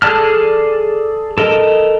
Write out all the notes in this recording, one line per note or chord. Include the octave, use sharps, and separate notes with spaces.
G#4 A4 D5 A5 F6
A4 A#4 D#5